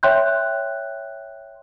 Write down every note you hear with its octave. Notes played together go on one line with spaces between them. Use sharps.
C#5 E5 G5 C6 F#6 G6